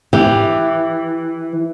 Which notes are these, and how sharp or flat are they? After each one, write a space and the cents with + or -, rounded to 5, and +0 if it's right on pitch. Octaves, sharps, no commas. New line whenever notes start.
E3 +0 G4 +5